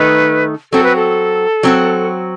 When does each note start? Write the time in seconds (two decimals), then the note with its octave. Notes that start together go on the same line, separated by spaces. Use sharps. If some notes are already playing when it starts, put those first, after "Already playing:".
Already playing: D#3 A3 D#4 A4 B4
0.72 F#3 C4 F#4 A4
0.84 B4
0.96 A4
1.63 F#3 C4 F#4